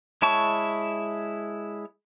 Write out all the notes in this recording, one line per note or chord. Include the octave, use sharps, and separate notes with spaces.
G#3 E4 C#5 A5 C#6